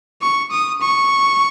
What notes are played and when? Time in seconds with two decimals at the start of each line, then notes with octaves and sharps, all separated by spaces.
0.22 C#6
0.51 D#6
0.81 C#6